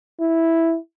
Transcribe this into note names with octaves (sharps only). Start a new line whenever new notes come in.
E4